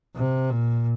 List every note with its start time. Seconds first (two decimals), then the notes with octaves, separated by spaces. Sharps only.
0.16 C3
0.50 A#2